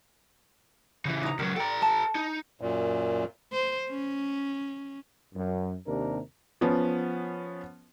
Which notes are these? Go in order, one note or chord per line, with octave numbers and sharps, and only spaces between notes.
C#3 E3
D#4 A#5
C#2 F#3 A#4
A4 D5 G5 A#5
A5
D#4
F#2 A#2
C5
C#4
F#2
D#2 C3 D4 A#4
F3 B3 C#4